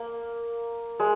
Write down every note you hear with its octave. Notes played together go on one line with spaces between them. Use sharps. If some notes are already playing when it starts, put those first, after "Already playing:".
Already playing: A#3
G#3